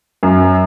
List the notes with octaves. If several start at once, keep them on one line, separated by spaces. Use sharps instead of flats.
F#2